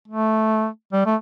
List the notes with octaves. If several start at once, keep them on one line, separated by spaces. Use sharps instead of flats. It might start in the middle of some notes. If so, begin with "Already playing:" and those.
A3
G3
A3